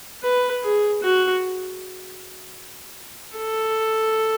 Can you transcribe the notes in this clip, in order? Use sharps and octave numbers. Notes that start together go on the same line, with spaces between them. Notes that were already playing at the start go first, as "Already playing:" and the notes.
B4
G#4
F#4
A4